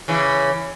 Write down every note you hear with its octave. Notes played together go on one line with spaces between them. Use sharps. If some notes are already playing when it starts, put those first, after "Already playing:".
C#3 E3